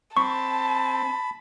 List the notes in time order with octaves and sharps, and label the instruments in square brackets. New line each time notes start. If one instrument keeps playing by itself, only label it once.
[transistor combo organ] C4 [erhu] A5 [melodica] B5 [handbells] C#6